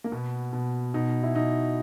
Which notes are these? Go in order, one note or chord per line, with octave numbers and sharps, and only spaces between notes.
A#3
B2 B3
B2
B2 D#4
E4
B2 D#4